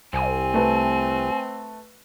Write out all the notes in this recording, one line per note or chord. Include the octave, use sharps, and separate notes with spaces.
C2 C4 G#5
A3 A4 B4